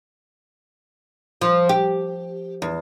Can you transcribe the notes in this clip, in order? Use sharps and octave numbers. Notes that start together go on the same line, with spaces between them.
F3
G4
E2